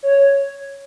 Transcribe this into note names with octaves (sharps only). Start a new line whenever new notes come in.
C#5